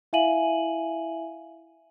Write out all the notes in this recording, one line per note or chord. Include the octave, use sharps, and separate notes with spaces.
E4 E5 F5 G#5 D#7 F#7